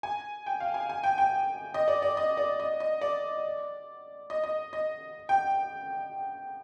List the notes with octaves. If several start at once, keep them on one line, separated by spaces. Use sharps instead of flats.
G#5
G5
F5
G#5
G#5
G5
G5
D#5
D5
D5
D#5
D5
D#5
D#5
D5
D#5
D#5
D#5
G5